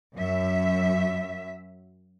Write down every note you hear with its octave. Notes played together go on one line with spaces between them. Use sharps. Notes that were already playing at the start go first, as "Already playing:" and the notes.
F#2 E5